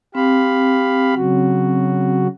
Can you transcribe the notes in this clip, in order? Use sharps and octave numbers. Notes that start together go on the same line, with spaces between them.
C4 G4 F5 B5
C#3 F#3 F#4